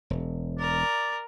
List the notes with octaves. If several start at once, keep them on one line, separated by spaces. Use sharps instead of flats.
E1
A#4 D5